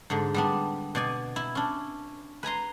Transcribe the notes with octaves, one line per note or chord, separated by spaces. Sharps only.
G#2 D3
G3 B3 D4
B2 D5 G#5
E4
C#4 D4
B4 G#5 A#5 C6